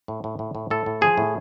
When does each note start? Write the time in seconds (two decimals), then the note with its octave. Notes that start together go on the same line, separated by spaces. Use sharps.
0.08 A2
0.24 A2
0.39 A2
0.55 A2
0.70 A2 A4
0.86 A2
1.01 F3 G#4
1.17 A2